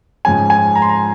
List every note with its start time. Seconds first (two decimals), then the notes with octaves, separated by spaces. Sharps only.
0.25 G#2 F3 G#3 C#4 G#5
0.50 G#5
0.75 A#5
0.82 C6
0.89 A#5